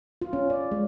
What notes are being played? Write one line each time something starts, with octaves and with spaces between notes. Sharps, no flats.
F4
C#4
D5
G#3